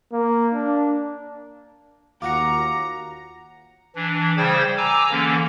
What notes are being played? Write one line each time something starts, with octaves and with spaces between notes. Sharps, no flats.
A#3
D4
D#2 F4 F#4 A#5 D6 C#7
E3 D4
C#3 G3 G#4 C5 G5 G#6
G#5 A#5 D6 E6
D3 E3 A#3 C#4